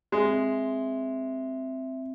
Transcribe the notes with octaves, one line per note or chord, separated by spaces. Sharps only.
G#3 C4 E5